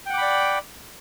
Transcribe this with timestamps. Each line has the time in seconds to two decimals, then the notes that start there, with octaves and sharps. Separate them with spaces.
0.06 G5
0.10 F#5
0.14 D6
0.18 B5
0.22 D5